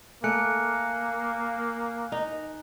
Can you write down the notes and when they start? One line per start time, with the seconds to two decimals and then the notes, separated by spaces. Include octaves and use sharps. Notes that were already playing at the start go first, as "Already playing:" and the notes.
0.24 A3 A#3 G#5 F#6 C#7
2.12 D#4